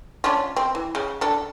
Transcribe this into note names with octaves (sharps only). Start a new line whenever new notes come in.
C#4 D4 F4
C4
E3
C#3
D4 A4